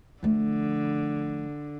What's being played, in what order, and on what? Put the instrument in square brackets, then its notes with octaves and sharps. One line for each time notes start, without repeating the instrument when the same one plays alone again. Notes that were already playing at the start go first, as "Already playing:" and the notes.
[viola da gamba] D3 [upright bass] F3 A3